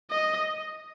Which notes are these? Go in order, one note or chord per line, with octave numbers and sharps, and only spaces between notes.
D#5